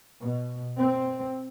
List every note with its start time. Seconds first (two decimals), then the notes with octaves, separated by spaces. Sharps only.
0.21 B2
0.79 C4